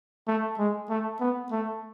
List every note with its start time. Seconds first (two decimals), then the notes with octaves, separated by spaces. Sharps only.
0.28 A3
0.59 G#3
0.90 A3
1.21 B3
1.52 A3